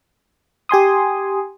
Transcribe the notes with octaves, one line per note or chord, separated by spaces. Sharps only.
G4 G#5 C6 D#6